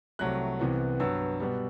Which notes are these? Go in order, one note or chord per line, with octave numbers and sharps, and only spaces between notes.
C2 C3 F#3 A3 F#6
C2 C3 E3 B3
G2 F#3 B3 E6
B2 G3 B3